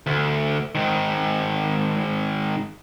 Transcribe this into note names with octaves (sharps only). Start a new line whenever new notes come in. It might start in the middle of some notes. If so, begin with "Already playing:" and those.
D2
G#2 D#3